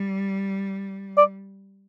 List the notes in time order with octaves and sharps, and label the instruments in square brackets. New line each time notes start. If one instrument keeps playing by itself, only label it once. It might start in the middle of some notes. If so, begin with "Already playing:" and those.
Already playing: [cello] G3
[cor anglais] D5